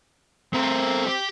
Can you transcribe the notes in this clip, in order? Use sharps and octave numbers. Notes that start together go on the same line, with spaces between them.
A3 C4 A#4
G4